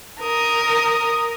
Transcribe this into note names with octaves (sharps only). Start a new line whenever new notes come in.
A#4 D#6